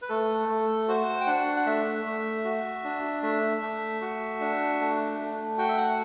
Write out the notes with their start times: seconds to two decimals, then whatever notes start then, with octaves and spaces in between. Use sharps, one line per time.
0.02 B4
0.09 A3 A4
0.49 A3
0.88 F#4 C5
1.21 G5
1.27 D4 F#5
1.56 F#5
1.66 A3 E5
2.06 A3
2.45 F#4
2.84 D4
3.23 A3 E5
3.62 A3
4.01 F#4
4.40 D4
4.80 A3
5.19 A3
5.58 F#4 G5
5.69 E5
5.78 F#5